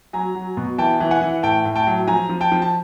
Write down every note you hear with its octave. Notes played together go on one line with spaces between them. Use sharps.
F#3 G#5 A#5
F#3
B2
E3 G5 A5
E3
F#5 G#5
E3
A2 G5 A5
A2
G5 A5
F#3
F3 G#5 A#5
F3
G5 A5
F3
A5